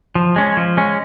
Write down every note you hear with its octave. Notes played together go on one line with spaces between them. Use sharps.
F3
G#3 C#4
F3
G#3 C#4